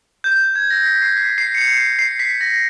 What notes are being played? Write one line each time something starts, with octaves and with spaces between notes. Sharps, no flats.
G6
G#6
A#6
B6
C7
B6
C7
C#7
C7
C#7
C7
B6
A#6